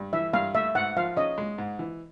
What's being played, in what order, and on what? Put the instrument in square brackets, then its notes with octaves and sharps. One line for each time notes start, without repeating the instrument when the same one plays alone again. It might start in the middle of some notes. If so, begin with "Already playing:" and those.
Already playing: [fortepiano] G2
[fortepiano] E3 [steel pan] E5
[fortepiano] G2 [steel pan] F5
[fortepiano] A3 [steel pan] E5
[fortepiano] G#2 [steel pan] F#5
[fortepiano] F3 [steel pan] F5
[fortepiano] C#4 [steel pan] D#5
[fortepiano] G#3
G#2
E3